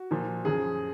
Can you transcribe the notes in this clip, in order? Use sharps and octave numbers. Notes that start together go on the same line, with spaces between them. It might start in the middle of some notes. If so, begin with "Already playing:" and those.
Already playing: F#4
A#2 F3
F#2 F3 G#4